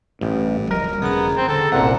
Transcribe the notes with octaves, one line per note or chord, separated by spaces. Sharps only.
A1 G2
D1 F3 G3 A#4 D#5
E1 C#3 B3 G#4 A#5
C4
D3 A4
G1 C2 A#2 C#3 F#5